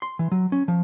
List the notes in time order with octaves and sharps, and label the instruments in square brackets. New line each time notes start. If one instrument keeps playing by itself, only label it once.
[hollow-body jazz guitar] C6
E3
F#3
C#4
F3